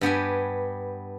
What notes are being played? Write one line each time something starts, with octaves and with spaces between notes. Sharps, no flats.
G2 B3 G4 G#5